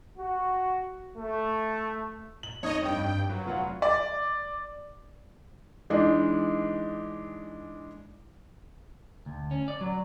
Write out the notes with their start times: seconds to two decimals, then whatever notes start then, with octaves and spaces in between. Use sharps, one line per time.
0.18 F#4
1.17 A3
2.43 F#7
2.63 F2 D#4 C#5 D#5 D#6
2.82 G2 G5
3.29 F#3 B4
3.45 F1 F4 F#5
3.82 D5
5.90 E3 G#3 D4 D#4
9.26 D2
9.51 C#4
9.68 D5
9.81 F#3